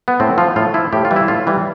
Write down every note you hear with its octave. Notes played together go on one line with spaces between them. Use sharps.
B3
A2 C4
F3 F4
A2 F4
F3 E4
A2 G4
F4
E3 G3
E4
A2 F4
E3 G3